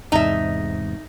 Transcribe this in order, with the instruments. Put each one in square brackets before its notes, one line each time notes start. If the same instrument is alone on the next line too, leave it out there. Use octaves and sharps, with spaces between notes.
[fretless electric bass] E2 G#2 C3 [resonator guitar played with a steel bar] D#4 E5